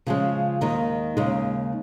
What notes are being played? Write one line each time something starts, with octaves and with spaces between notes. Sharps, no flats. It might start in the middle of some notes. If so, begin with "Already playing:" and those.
C#3 F3 G#3
D#2 D#3 G#3 D#4
D#2 C#3 G#3 D#4